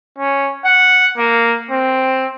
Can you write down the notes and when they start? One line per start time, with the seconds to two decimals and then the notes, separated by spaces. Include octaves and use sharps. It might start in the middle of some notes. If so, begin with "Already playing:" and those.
0.19 C#4
0.65 F#5
1.18 A#3
1.71 C4